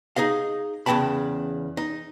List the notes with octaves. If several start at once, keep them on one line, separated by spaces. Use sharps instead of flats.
D#4 G#4 D#5 F5
E2 C#3 F#3 G5 A5 B5
D#4